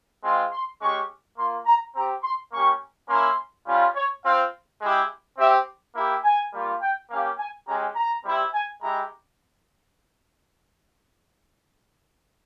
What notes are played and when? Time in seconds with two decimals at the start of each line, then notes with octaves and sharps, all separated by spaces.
0.23 G#3 C4 F4 C6
0.52 C6
0.80 G#3 C#4 G4 C#6
1.38 A#3 F4 C6
1.66 A#5
1.95 C4 G4 A#5
2.23 C6
2.52 A#3 C#4 G4 C#6
3.09 A#3 C#4 E4 C6
3.67 G3 C#4 F4
3.95 C#5
4.24 C4 F4 F5
4.81 G#3 E4 G4
5.38 C4 G4 E5
5.95 A#3 E4 G4
6.24 G#5
6.53 G3 A#3 F4
6.82 G5
7.10 A#3 C#4 G4 F5
7.38 G#5
7.67 G#3 C#4 G4 A#5
7.95 A#5
8.24 G3 C4 E4 G4
8.53 G#5
8.81 G#3 E4 G4 A#5